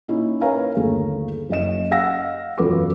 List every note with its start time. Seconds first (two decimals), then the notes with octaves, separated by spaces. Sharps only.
0.08 A#2 C#4 D#4 E4
0.41 A#4 B4 C#5 F5 G#5 A#5
0.77 G1 D#2 A3 G#4
1.49 F#1 C#4 D#5 E7
1.91 D#5 F5 F#5 E6 A#6
2.58 E1 F#2 F4 A4 B4 D6